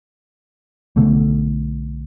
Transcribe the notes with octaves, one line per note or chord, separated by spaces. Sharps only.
B1 B2 D3 A3